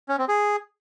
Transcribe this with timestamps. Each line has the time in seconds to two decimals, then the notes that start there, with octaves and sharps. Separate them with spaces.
0.09 C#4
0.18 C4
0.28 G#4